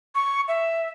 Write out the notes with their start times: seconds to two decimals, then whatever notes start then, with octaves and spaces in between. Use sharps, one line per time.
0.15 C#6
0.48 E5